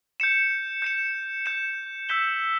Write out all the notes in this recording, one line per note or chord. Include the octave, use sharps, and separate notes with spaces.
G6 C#7 E7
G6 C#7 E7
G6 C#7 E7
E6 G6 B6 E7 G7